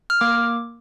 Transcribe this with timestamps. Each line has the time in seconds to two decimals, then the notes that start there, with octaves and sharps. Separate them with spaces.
0.10 F6
0.21 A#3 D6